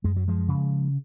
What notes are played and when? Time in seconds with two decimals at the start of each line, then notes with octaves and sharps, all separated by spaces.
0.04 F#2 G#3
0.16 F#3
0.28 F3 G#3
0.48 C#3